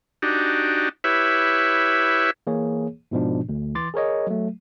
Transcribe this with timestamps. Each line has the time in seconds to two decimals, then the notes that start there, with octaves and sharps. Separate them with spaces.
0.22 D4 D#4 F#4 G4
1.04 E4 G4 B4 C#5 E5
2.47 E3 A#3 G#4 C#5
3.11 G#2 B2 F3 D4
3.49 D2
3.75 E3 C6 D6 A6
3.94 G#4 A#4 C#5 D#5
4.27 F#3 A3